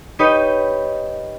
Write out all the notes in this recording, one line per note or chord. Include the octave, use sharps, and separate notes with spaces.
D#4 G4 B4 C#5 D#5